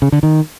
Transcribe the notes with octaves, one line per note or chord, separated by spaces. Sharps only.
C#3
D3
D#3